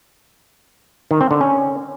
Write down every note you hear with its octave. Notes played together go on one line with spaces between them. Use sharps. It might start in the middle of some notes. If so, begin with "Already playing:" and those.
D#3
C4
D3
C#4